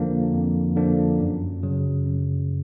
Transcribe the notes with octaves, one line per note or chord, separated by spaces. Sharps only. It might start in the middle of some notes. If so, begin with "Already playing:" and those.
Already playing: F2 D3 F3 A#3 D4
F2
D3 F3 A#3 D4
F#2
C#3 F#3
F#2